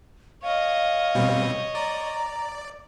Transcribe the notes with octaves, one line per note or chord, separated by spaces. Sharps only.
C#5 D#5 F5
B2 G3 C4
D5 A#5